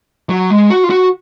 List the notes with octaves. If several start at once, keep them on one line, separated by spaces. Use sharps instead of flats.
F#3
G#3
F#4
F4
F#4